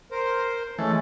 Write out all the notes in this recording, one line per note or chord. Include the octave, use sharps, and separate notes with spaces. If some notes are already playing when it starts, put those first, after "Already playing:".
A#4 C5
E3 G#3 A3 C#4